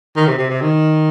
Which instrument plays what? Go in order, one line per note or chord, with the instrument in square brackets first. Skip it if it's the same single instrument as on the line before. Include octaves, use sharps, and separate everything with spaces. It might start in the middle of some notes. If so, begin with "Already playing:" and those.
[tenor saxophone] D#3
C3
C3
C3
D#3